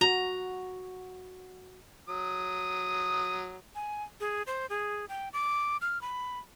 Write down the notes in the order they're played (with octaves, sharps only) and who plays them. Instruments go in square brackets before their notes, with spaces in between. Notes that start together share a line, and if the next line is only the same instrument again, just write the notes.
[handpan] F#4 [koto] A#5
[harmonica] F#3 D#6
[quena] G#5
G#4
C5
G#4
G5
D6
F6
B5